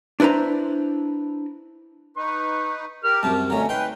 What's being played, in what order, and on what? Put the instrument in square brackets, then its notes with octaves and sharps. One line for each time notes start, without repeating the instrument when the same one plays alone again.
[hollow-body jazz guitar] D4 E4 B4 C5 A#5
[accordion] D#4 B4 [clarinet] C#6
[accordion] G4 A#4 [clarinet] F6
[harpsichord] C2 F#2 C3 [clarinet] A5
[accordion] B2 C#4 [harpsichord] D3 A3 [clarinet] A#5
[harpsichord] D#4 C6 [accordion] B4 [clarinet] G5